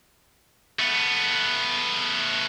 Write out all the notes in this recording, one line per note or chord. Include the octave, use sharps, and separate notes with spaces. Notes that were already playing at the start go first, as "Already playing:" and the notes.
A3 B3